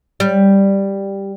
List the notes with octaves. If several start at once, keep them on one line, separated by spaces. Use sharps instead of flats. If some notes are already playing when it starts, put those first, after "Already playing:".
G3